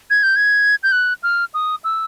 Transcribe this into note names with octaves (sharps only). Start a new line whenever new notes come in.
G#6
G6
G#6
G6
F#6
F6
D#6
E6